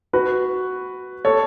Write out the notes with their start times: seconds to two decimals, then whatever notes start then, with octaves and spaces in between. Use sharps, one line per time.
0.13 F#4 B4
1.25 A4 C#5